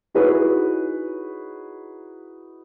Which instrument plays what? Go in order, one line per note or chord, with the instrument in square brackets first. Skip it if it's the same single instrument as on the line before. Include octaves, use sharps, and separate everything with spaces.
[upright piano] D#4 E4 F#4 G#4 B4 C#5